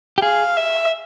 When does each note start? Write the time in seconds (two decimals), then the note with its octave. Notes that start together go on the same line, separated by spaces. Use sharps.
0.18 G4
0.22 G#4 F5
0.57 E5